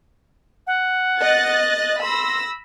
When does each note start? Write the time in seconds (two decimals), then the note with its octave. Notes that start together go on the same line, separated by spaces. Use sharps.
0.67 F#5
1.20 D#5 F#6 A6
2.02 B5 C6 E6 A#6